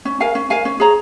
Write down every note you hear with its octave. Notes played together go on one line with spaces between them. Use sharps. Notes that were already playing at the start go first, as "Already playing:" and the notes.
C#4
A#4 F5 G#5
C#4
A#4 F5 G#5
C#4
G#4 C#5 A#5